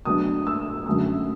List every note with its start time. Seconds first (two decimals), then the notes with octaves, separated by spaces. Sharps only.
0.05 B2 F#3 A3 D4 D#6
0.47 E6
0.86 F#2 D3 F#3 A3 C#4 D#6